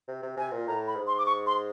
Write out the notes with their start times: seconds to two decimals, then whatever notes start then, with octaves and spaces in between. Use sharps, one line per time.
0.08 C3
0.22 C3
0.37 C3 G#5
0.52 A#2
0.67 A2 A#5
0.87 B5
0.96 G#2
1.07 C6
1.18 D6
1.26 C#6
1.46 C6